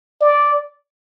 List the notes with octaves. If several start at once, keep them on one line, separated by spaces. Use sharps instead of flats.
D5